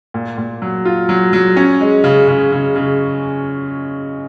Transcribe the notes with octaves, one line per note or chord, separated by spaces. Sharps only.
A#2
A#2
F#3
F4
F#3
F#3
C#4
G#3
C#3
C#3
C#3
C#3